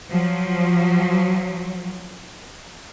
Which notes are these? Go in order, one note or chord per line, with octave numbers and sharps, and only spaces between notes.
F3 F#3